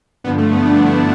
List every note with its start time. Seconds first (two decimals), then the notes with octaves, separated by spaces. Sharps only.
0.24 G2 D3 F3 B3
0.38 A3
0.52 B3
0.65 G2 D3 F3 D4
0.85 E4